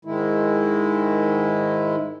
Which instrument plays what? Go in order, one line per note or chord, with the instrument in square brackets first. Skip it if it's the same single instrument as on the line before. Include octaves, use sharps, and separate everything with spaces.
[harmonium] G#2 D#3 G#3 E4